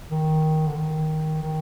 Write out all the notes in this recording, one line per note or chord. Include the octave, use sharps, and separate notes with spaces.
D#3
D3
D#3
D#3